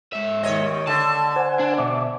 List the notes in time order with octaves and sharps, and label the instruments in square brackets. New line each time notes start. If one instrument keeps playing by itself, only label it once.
[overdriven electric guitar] G#2 E5
[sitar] D#2 C#5 D#5
[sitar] D3 [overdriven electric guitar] A5
[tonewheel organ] C5 F#5 G#5
[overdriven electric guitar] D4
[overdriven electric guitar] B2 [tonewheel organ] E5 D6